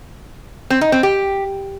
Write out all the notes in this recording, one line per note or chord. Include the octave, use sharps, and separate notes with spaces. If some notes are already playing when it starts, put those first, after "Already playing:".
C4
D#4
C4
G4